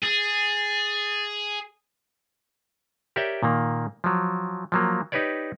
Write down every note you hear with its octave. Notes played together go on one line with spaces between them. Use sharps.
G#4 A6
G4 A#4 C#5 D5 E5 G5
A#2 D#3 A#3
F3 F#3
F3 F#3 A#3
D#4 G4 B4 C#5 D5